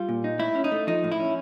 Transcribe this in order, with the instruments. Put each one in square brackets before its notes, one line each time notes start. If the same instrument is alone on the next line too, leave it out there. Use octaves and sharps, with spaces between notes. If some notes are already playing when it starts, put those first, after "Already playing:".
Already playing: [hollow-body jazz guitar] G3 F4
A#2
D#4
A2 E4
C#4
D#4
A3
F3 D#4
A2
E4
C#4